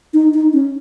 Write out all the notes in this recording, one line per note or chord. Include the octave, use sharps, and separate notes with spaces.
D#4
D#4
C#4